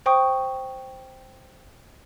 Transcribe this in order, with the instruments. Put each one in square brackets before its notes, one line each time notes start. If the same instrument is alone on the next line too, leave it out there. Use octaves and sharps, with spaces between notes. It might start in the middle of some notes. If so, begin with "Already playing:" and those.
[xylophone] C5 G5 C#6 D#6